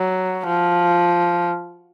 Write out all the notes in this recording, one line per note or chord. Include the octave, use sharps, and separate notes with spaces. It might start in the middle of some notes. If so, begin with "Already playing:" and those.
Already playing: F#3
F3